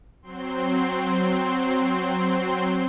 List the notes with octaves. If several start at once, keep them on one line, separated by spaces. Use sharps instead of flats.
F#3 C4 C6